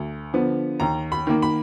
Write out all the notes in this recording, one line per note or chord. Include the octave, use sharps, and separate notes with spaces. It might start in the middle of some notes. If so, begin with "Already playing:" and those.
Already playing: D2
D3 F3 B3
D#2 A#5
B5
D#3 A#3
B5